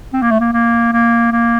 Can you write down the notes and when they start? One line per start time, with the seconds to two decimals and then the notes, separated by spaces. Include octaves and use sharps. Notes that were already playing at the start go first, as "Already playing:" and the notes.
0.13 C4
0.22 A#3
0.31 A3
0.40 A#3
0.53 A#3
0.93 A#3
1.32 A#3